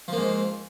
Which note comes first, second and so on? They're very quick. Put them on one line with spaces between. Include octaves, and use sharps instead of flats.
F3 A#3 G#2